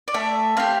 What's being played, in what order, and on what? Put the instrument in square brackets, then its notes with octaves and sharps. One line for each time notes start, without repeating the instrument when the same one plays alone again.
[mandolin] D5
A3 E5
C4 G4 F5